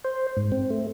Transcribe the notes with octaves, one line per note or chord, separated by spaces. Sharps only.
C5
G#2
C4
A3